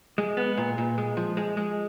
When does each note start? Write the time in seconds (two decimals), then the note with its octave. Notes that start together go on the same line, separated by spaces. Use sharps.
0.18 G#3
0.37 B3
0.57 A#2
0.78 A#2
0.98 G#3
1.17 F3
1.37 G#3
1.57 G#3